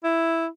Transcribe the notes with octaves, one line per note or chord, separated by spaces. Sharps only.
E4